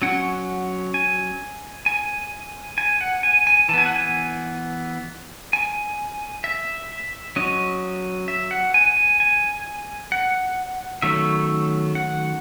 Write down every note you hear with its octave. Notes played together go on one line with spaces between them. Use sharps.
F#3 C#4 F#5
G#5
G#5
G#5
F#5
G#5
G#5
E3 A5
B3 G#5
F#5
G#5
G#5
E5
F#3 C#4 D#5
E5
F#5
G#5
G#5
G#5
F#5
D#3 F#3 A3 C#4 E5
F#5